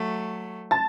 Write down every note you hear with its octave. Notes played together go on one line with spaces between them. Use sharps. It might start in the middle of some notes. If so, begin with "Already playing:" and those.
Already playing: F#3 A3
A5 A6